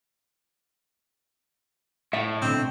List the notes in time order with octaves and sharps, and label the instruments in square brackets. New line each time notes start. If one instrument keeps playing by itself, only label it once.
[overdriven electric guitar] A2 [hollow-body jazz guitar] E5
[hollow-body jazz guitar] B1 D3 [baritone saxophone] C4